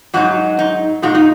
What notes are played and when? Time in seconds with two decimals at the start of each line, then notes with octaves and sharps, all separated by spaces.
0.14 G#2 F#3 D#4 F#4
0.59 D#4
1.02 A#2 G#3 D#4 F#4
1.15 D#4